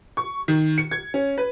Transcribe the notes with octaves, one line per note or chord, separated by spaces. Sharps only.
C#6
D#3
C#7
G#6
C#4
B4